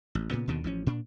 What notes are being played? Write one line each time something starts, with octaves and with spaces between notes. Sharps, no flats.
A1
A#2 C#3 B3
D#2 B2 D3 D#3
A1 F3 C#4
A#2 D4